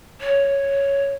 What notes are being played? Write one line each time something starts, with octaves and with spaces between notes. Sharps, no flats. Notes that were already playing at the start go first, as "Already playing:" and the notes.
C#5